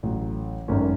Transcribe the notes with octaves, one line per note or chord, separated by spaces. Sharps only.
A1 A2 F#3
G#1 F#2 D#3 A3 C#4